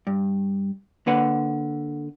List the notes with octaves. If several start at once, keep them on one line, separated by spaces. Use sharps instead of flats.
G2
D3 A#3 B4 F#5